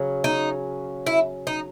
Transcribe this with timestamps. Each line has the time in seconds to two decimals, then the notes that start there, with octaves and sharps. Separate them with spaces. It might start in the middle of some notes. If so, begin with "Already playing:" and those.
Already playing: C#3 F#3 C#4
0.24 D#4
1.07 E4
1.47 D#4